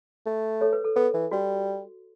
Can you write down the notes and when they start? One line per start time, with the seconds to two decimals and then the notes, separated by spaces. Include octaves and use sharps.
0.26 A3
0.61 A4 C#5
0.73 B4
0.85 A4
0.96 B3 A4
1.14 E3
1.31 G3 F#4